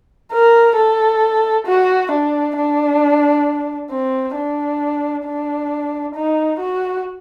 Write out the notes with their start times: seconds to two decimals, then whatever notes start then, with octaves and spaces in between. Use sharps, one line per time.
0.32 A#4
0.77 A4
1.67 F#4
2.11 D4
2.57 D4
3.91 C4
4.36 D4
5.25 D4
6.15 D#4
6.60 F#4